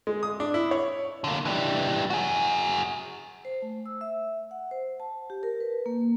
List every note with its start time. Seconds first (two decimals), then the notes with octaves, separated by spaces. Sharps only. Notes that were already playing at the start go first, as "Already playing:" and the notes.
0.07 G#3
0.23 D#6
0.40 D4
0.54 E4
0.71 C#5
1.24 D3 A#3
1.45 E3 G3
2.10 F#4 G#4
3.45 C5
3.62 A3
3.86 E6
4.01 E5
4.51 F#5
4.71 C5
5.00 A5
5.30 G4
5.43 A#4
5.60 B4
5.86 A#3